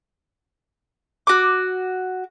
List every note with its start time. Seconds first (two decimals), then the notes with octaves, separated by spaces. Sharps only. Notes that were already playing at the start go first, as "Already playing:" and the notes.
1.27 F#4 D6